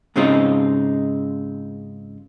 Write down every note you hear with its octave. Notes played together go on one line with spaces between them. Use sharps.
G#2 C#3 G#3 C4 D#4 F4